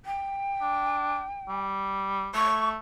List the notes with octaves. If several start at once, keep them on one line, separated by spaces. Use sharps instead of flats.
G5
D4
G3
A3 C#6